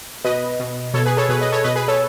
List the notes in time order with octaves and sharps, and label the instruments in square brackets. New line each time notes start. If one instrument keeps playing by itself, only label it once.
[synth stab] B2 B4 D#5
B2
B2 A4 C#5
G#4 B4
A4 C#5
B2 G#4 B4
B4 D#5
A4 C#5
B2 B4 D#5
G#4 B4
A4 C#5